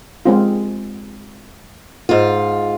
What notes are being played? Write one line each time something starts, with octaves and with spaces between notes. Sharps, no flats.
G#3 C4 F4
G#2 F4